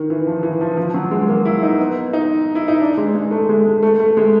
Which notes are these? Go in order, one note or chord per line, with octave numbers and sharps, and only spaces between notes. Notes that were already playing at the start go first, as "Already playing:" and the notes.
Already playing: D#3
E3
F3
E3
F3
F3
F#3
G#3
A#3
E4
D#4
B3
D#4
E4
D#4
D4
G#3
G#3
A3
G#3
G#3
A3
A3
G#3